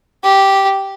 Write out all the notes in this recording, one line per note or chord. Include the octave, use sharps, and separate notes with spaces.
G4